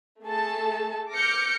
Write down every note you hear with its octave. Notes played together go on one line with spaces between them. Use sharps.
A3 G#4 A4 A5
D6 F6 G6 A#6 C#7